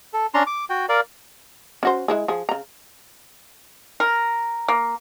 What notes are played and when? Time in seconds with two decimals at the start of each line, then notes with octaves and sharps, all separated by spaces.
0.13 A4
0.34 C#4 D4 A#5 C6
0.47 D6
0.70 F#4 G5
0.89 A#4 D5 F5
1.83 C#4 F#4 C5
2.08 G#3 E4 G#4
2.28 F3 G#4
2.49 C#3 A#5
4.00 A#4
4.68 A#3